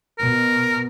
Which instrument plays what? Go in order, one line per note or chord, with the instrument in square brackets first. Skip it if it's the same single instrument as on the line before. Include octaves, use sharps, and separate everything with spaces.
[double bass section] B2 [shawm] A#4